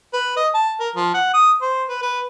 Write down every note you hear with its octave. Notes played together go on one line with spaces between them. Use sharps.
B4
D#5
A5
A#4
F3
F#5
D#6
C5
B4
B4